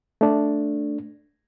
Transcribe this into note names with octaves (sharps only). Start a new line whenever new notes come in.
A3 D4